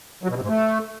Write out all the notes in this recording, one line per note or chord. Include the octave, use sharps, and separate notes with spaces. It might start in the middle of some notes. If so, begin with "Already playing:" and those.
F#3
B2
C3
G#2
A3